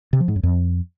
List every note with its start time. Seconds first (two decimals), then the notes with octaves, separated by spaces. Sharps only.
0.13 C3
0.20 F3
0.28 G#2
0.36 F#2
0.43 F2